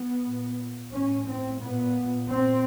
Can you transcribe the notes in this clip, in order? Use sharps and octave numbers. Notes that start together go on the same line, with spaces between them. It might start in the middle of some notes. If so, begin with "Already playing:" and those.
Already playing: B3
A#2
A2 C#4
C4
A#2 B3
A#2 C4